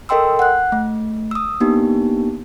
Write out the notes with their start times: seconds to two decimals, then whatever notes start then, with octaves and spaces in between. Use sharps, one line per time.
0.09 A4 A#4 D#5 G5 C6 E6
0.39 F#5 F#6
0.72 A3
1.31 D#6 E6
1.60 A#3 B3 D4 D#4 G4